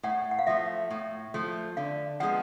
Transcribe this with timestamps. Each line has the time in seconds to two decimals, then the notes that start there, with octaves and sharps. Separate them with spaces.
0.03 A2 F#5
0.31 F#5
0.39 F5
0.47 F3 A3 E5
0.91 A2
1.34 F3 A3
1.77 D3 F5
2.20 F3 G#3 B3 F#5